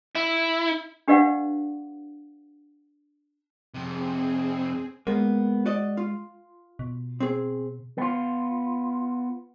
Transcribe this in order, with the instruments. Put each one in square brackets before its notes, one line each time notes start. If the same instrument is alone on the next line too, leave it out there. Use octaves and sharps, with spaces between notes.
[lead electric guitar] E4
[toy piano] D4 G4 B4 D5 F5 F#5
[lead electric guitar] F2 C3 [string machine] C4 G#4
[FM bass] G#3 [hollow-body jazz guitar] A#3 B3
[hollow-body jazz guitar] F#4 D5 D#5
F4
[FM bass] B2
[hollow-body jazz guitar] C4 G#4
[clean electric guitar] B3 F4